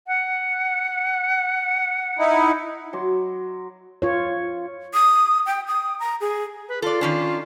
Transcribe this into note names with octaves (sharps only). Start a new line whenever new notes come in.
F#5
D#4 E4
F#3 C6 D6
F4 C#5
D#6
G5
D#6
A#5
G#4
B4
F4 A4 D5
D#3 C#4 D4